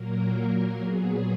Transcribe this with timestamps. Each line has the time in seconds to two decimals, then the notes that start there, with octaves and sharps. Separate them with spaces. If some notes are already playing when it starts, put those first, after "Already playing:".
Already playing: A#2 F#3 A#3 A#4
0.81 A#2 F#3 B3 G#4